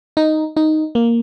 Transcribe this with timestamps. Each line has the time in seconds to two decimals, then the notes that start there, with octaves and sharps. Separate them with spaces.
0.17 D#4
0.57 D#4
0.95 A#3